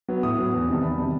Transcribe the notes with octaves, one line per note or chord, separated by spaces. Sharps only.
F#3 B3
A2 D#6
F#3 B3
E2
C3 D#3 G3 A5
E2 B5
C3 D#3 G3